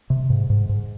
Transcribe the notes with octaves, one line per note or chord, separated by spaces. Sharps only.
C3
G#2
G#2
G#2